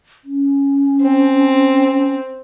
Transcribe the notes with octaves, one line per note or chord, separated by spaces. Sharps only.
C#4
C4